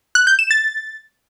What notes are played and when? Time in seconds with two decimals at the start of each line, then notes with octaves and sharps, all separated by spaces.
0.15 F#6
0.27 G6
0.39 E7
0.51 A6